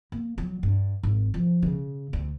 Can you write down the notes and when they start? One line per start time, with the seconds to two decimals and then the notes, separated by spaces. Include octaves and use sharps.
0.12 A#3
0.38 F#3
0.63 G2
1.03 G#1
1.34 F3
1.62 C#3
2.13 D2